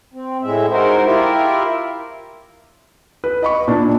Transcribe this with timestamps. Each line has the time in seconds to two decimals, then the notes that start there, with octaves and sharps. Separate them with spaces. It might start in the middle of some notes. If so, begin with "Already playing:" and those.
0.14 C4
0.43 A2 G#3 E5
0.72 G#3 D#4 F#4 A#4 C5
1.05 E4 F4 G4 A#4 E5
3.24 B4
3.43 D#5 B5 C#6
3.68 A#2 D4 D#4